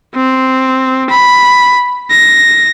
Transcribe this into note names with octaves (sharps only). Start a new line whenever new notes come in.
C4
B5
A#6